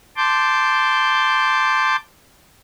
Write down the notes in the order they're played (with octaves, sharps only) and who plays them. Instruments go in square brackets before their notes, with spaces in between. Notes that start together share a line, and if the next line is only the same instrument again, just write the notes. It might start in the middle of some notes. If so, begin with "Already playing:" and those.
[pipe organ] A5 C6 D6 G6